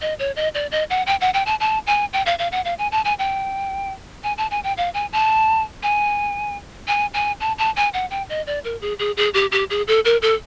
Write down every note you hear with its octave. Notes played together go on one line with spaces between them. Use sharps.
D#5
C#5
D#5
D5
D#5
F#5
G5
F#5
G5
A5
A5
G#5
G5
F5
F5
F#5
F5
G#5
A5
G#5
G5
G#5
A5
G#5
G5
F5
G#5
A5
G#5
G#5
G#5
A5
A5
G#5
F#5
G5
D#5
D5
A#4
G#4
G#4
G#4
G4
G4
G#4
A4
A#4
A4